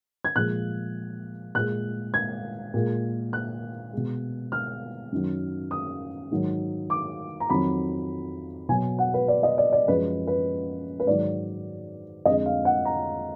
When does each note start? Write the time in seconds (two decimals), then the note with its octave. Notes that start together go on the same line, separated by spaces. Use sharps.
0.25 G#6
0.35 A#2 F3 G#3 F#6
1.55 A#2 G#3 F#6
2.14 G#6
2.74 A#2 G#3
3.33 F#6
3.93 B2 G#3
4.52 F6
5.12 F#2 D#3 F#3
5.71 D#6
6.31 G#2 D#3 F#3
6.90 D6
7.40 A#5
7.50 F2 D#3 F#3 B5
8.69 B2 F#3 G#5
8.99 F#5
9.14 B4
9.28 D5
9.43 D#5
9.58 D5
9.73 D5
9.88 F#2 F3 G#3 B4
10.27 B4
11.00 B4
11.06 G#2 D#3 F#3 D5
12.25 F2 D3 G#3 D#5
12.46 F5
12.65 F#5
12.85 A#5